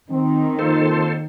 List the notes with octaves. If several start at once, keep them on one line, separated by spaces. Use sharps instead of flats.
D#3 C4
F2 A#3 A4 C5